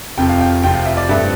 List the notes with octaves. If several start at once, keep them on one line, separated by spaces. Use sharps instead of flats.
F1 F2 C3 F3 G5
F5
G5
F1 F2 C3 F3 G5
F5
E5
D5
G2 F3 A3 C4